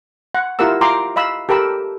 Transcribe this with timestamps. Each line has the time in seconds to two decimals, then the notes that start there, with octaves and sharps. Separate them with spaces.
0.35 F#5
0.59 E4 F4 G4 A#4 F#5 E6
0.81 F4 G5 A#5 C6 D6
1.16 D#5 F5 B5 E6
1.49 G4 A4 A#4 G5 B5 E6